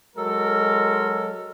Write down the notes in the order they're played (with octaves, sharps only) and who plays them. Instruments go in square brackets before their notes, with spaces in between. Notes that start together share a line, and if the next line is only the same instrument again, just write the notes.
[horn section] F#3 G#3 A4 A#4